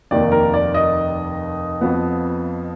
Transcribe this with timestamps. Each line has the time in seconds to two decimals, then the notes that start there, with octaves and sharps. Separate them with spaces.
0.11 F1 D#2 D#3 A#3 D5
0.32 A#4
0.54 D5
0.74 D#5
1.81 F2 F3 B3